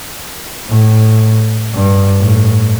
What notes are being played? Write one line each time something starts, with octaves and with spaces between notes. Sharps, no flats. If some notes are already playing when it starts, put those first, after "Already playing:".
A2
G2
A2